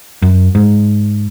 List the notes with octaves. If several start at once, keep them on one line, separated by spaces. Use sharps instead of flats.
F#2
G#2